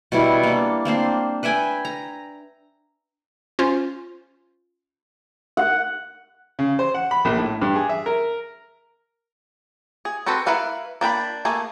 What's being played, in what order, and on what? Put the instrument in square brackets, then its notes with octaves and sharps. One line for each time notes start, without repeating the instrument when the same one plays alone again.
[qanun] B2 G3 E4
A#3 D4
A#3 C4 D4 C6
B4 E5 G5 G#5
A#5
[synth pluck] C#4 F4 C5
[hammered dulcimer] F#5
[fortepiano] C#3
C5
F#5
B5
A#1
A2
G2
G#4
E5
A#4
[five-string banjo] G#4
C4 F#4 A4 B4 C5
E4 A#4 B4 F5 F#5
A#3 D4 G5 B5
A3 A#3 G#4